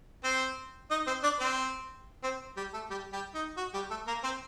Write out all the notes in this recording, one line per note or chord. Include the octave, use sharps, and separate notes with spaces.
C4 C5
D#4 D#5
C4 C5
D4 D5
C4 C5
C4 C5
G3 G4
A3 A4
G3 G4
G3 G4
D#4
F#4
G3 G4
A3 A4
A#3 A#4
C4 C5